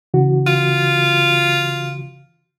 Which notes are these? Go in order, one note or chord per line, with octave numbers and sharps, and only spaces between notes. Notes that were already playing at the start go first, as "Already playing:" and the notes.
C#3 E3 F#4
F4